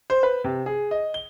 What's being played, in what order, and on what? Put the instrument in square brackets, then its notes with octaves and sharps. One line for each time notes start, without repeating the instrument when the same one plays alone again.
[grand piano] C5
B4
C3
G#4
D#5
G7